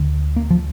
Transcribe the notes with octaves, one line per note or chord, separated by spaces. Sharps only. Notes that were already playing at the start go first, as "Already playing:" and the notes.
Already playing: D2 D3
A#3
F3